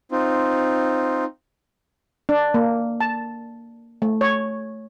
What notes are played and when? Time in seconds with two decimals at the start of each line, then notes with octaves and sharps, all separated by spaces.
0.12 C4 D#4 F4
2.29 D4
2.54 A#3
3.01 A5
4.02 A3
4.21 C#5